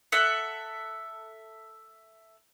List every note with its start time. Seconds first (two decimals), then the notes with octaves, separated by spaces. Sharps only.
0.12 A4 E5 F#5